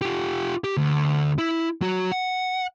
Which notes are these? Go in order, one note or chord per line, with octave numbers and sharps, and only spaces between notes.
F4 G4
G4
D2
E4
F#3 F#4
F#5